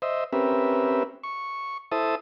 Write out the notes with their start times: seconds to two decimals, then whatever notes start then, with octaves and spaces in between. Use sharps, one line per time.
0.02 C5 D#5 E5
0.33 C4 C#4 G4 A#4 B4 E5
1.23 C#6
1.92 E4 A4 C5 E5 A5 D#6